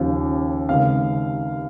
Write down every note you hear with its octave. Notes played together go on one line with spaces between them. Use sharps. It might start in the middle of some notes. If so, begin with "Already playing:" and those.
Already playing: D#2 C#3 F3
C#2 C3 D#3 F5